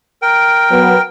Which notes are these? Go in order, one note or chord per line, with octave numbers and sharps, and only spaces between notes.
A#4 G5
F#3 B3